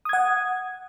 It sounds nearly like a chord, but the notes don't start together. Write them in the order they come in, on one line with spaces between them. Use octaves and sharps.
D#6 G#6 F#5